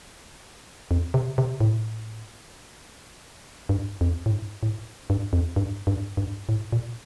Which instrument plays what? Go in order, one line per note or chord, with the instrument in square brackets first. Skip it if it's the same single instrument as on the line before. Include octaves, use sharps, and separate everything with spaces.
[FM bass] F2
C3
C3
A2
G2
F2
A2
G2
A2
G2
F2
G2
G2
G2
A2
A#2